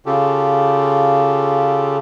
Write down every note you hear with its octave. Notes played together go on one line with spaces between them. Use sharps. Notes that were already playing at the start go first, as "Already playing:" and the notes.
C#3 F4 G4 A4